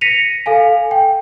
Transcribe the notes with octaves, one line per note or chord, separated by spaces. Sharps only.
A#6 B6 C#7 D#7 F7
A4 F5 G#5
G5